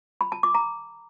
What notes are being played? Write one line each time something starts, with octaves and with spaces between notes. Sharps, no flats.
B5
A5
D6
A#5